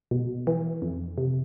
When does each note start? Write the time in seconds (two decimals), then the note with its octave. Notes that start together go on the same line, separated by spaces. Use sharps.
0.11 B2
0.47 E3
0.82 F2
1.18 C3